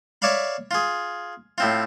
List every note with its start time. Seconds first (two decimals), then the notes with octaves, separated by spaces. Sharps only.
0.22 C#5 D5 E5 F5 B5
0.71 F4 G#4
1.58 A2 C4 F4